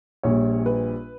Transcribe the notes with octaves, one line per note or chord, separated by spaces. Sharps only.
A#1 A#2 G3 C#5
B4